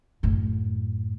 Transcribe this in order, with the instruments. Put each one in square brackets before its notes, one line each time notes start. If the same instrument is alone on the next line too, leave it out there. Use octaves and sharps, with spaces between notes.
[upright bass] F#2 A2